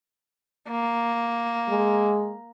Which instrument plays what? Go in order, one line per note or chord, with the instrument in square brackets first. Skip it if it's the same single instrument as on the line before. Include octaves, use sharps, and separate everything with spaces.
[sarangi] A#3
[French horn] G#3